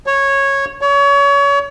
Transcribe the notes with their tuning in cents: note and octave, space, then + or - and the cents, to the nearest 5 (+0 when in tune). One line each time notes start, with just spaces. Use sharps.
C#5 -10
C#5 +30